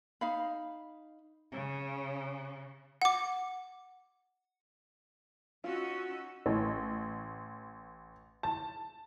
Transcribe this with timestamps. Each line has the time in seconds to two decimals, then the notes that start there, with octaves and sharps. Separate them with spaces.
0.21 D#4 F5 B5
1.52 C#3
3.02 F#5 D6
5.64 C#4 D#4 F4 F#4 E6
6.46 A1
8.43 A5